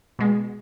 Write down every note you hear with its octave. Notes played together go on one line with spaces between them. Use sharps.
B2 G#3